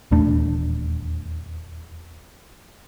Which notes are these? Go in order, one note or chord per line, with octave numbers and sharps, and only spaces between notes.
D#1 E2 A3 D4